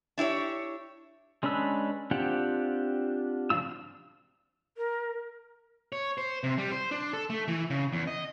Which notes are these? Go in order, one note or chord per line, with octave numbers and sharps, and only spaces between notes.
D4 E4 G4 C#5
G#3 C#4 D4 B4 E6
C4 D4 F4 G4 F#5
C#3 F3 D4 F4 E6
A#4
C#5
C5
C3
G3
C5
D4
A4
A3
E3
C#3
E2
D#5